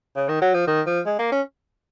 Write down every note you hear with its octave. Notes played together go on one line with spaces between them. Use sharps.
C#3
D#3
F#3
F3
D#3
F3
G#3
A#3
C#4